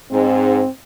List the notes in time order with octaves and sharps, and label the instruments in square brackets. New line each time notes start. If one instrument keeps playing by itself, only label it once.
[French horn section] G#2 [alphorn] C4